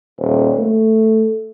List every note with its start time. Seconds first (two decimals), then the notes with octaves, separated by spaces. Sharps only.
0.19 D#1
0.58 A3